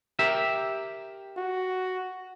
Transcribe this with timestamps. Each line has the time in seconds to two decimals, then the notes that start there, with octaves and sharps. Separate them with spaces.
0.19 G4 A#4 E5
1.37 F#4